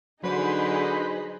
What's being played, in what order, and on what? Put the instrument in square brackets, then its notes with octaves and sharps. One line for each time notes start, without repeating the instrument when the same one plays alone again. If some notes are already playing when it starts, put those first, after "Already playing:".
[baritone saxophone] D3 [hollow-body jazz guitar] F#3 [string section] D#4 G#4 D#5 [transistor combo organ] B4 C5 B5